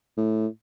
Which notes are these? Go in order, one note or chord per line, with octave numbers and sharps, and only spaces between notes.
A2